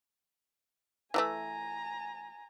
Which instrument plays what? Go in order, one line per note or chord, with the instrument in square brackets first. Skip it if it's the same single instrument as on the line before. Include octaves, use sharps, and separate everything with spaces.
[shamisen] E3 F#3 A3 [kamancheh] G#5 A#5